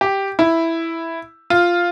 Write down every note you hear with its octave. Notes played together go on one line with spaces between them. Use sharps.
G4
E4
F4